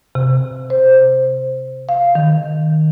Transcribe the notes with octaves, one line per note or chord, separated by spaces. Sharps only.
C3
C5
F5
D#3